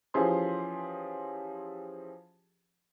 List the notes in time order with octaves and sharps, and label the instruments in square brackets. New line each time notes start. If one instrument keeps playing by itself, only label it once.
[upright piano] E3 F3 C#4 G4 G#4 C6